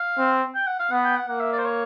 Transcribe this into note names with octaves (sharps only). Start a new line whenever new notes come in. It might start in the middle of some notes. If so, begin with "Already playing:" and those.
Already playing: F5
C4
G5
F#5
F5
B3 F#5
G5
F#5
A#3 F#5
E5
D5
C5
C#5